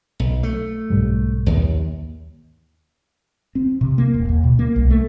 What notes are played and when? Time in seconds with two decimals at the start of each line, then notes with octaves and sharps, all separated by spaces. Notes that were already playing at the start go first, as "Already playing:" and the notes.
0.20 B1
0.43 A3
0.90 B1 G#2 G3
1.46 D#2
3.55 C4
3.81 C3
3.98 A#3
4.14 D#1
4.29 D#2
4.44 B2
4.59 A#3
4.76 C2
4.91 A3